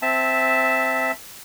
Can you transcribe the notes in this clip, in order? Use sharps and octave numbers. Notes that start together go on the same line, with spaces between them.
C4 E5 A5